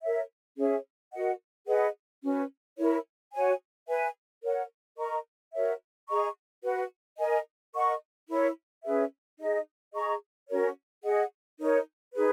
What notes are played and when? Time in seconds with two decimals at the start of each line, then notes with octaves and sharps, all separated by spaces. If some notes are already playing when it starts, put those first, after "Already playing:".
0.02 A#4 C#5 E5
0.57 C#4 G#4 C#5 E5
1.12 F#4 A#4 D#5 F#5
1.67 G#4 B4 D#5 F#5
2.22 C#4 F#4 B4
2.78 E4 A#4 C#5
3.33 F#4 C#5 G#5
3.87 B4 E5 G#5
4.43 A#4 C#5 F#5
4.98 A#4 D#5 A#5 C#6
5.52 F#4 A#4 C#5 E5
6.08 G#4 D#5 A#5 C#6
6.63 F#4 B4 F#5
7.18 A#4 D#5 G#5
7.74 A#4 D#5 F#5 C#6
8.28 E4 A#4 C#5
8.84 C#4 G#4 B4 E5
9.39 D#4 G#4 D#5
9.95 G#4 D#5 A#5 C#6
10.48 C#4 F#4 A#4 C#5
11.04 G#4 D#5 F#5
11.59 D#4 A#4 C#5
12.15 D#4 G#4 B4